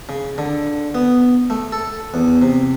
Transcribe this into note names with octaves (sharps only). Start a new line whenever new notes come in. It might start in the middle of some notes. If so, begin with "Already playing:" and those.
C#3
D3
B3
A3
A4
E2
C3